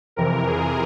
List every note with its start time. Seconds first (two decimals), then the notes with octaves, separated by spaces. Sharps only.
0.16 F2 C3 E3 A#4
0.47 G#4